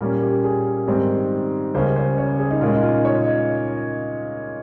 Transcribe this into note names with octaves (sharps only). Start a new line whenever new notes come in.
A#2 G3 A#3 C#4 A#4
G4
G#4
G#2 D#3 G3 C4
C#2 C#3 G3 A#3 C#4 C5
C5
C#5
G#4
D#4
A#2 G#3 C#4 F4
D#4
F4
C#5
D#5